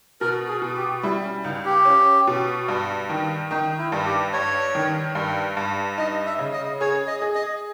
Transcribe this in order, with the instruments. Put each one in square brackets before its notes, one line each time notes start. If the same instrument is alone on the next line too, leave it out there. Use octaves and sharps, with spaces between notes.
[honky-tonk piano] B2 [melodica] A#4
[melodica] G#4
[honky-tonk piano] B2
[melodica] G4
[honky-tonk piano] G3 [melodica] E4
[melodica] C#4
[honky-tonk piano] C#2 [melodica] D#4
[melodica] G4
[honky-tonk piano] C#4
B2
G2
D#3
[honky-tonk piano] D#3 [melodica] D#4
[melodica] E4
[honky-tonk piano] G2
[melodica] G4
[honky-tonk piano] G2 [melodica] C#5
[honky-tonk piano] D#3
G2
G2
[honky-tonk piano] D#4 [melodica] D#5
[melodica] E5
[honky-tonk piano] C#3
[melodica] D#5
[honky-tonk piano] G#4 [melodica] C#5
[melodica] D#5
[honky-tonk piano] G#4
[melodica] D#5